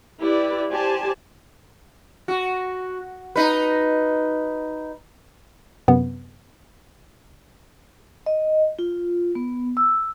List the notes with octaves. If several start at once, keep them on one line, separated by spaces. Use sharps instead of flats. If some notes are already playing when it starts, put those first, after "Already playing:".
E4 G4 B4 D5
G4 C5 D5 G#5 A5
F#4
D#4 B4
F#2 C3 B3
D#5
F4
B3
E6